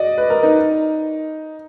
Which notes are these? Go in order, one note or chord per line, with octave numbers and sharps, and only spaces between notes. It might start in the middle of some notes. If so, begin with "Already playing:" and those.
Already playing: F#4 D5 D#5
B4
A#4
D#4